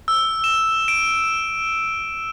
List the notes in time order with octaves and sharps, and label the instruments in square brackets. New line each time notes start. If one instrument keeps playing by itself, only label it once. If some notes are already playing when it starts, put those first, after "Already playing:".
[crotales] E6
E7
D7